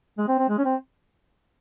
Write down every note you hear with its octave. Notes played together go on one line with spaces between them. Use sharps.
G#3
C4
C4
G#3
C#4
C4